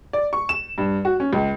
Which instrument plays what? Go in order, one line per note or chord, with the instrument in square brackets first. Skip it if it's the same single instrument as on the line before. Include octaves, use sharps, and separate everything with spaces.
[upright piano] D5
C#6
E7
G2
F#4
C#4
C#2